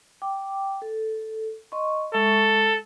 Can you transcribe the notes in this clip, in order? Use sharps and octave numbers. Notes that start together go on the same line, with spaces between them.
G5 D6
A4
D#5 C6 C#6
G#3 A4 E5 C#6